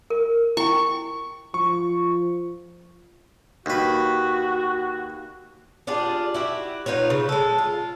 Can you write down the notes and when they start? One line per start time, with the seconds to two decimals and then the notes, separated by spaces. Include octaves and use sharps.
0.10 A#4
0.57 E4 G5 C#6
1.54 F3 C#6
3.66 D#2 F#4 B4
5.87 D4 F4 G4 G#4
6.34 E4 F#4 G4
6.86 D#4 F4 B4 C#5
7.10 C#3
7.29 G#3 A4
7.58 F4